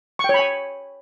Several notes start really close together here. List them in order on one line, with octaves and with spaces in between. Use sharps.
C#6 G5 C#5 B5 G#5